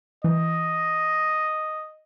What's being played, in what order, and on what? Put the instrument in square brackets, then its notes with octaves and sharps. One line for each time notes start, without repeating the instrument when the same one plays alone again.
[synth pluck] E3 [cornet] D#5